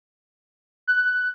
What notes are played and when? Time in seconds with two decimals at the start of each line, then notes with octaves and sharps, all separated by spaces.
0.87 F#6